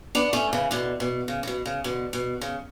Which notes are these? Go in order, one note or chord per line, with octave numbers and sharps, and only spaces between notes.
B3 D4
A3 C#4
C#3 E3
B2 D3
B2
C#3
C#3
B2
C#3
B2 D3
B2
C#3